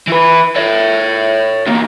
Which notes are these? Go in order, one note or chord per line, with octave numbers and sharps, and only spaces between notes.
E3 B4
C#5 E5
E2 A#3